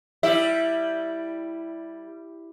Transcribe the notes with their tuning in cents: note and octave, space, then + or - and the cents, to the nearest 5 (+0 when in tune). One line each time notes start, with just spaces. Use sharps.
G3 +0 E4 +0 E5 +0